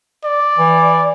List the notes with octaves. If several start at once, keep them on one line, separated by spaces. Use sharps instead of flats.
D5
E3